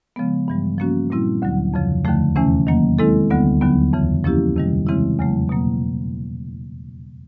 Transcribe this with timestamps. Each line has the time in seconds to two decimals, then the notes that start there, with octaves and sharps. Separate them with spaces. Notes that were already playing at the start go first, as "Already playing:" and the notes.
0.16 C#3 F3 G#3 B3
0.48 G2 E3 G3
0.78 F3 A#3 C#4 F#4
1.10 A#2 G3 C4 E4
1.42 D2 D3 F#3
1.74 F2 C#3 F3
2.05 D#2 D3 F3 A3
2.36 E2 C3 E3 A3 C#4
2.67 D#3 F#3 A#3
2.99 D#3 G#3 C4 E4 A4
3.30 D2 D3 G3 B3
3.61 D#2 D3 F#3 B3
3.93 F2 C#3 E3
4.24 F3 A#3 C#4 E4 G4
4.56 F2 C3 D#3 G3
4.87 C#3 E3 G#3 C4 E4
5.19 E2 C#3 F#3 A3
5.49 B2 F#3 A#3